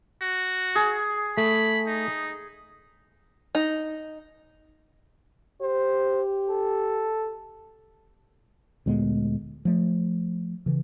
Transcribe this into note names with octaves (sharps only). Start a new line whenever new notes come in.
F#4
G#4
A3 B5
D#4
D#4
G4 C5
A4
D2 A#2 G#3 B3
F3 A3
C#3 E3